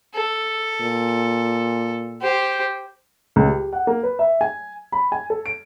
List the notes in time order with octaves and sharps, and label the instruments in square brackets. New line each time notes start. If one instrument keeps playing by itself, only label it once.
[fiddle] A4
[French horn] A#2
[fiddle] G4 C5
[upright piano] C#2
G4
F#5
A#3
B4
E5
G#5
B5
G#5
A4
D7